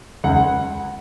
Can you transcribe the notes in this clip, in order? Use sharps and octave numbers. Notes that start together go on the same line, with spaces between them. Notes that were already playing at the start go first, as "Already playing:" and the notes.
C#2 F#5